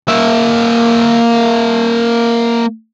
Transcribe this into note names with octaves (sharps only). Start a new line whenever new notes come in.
A#3 E5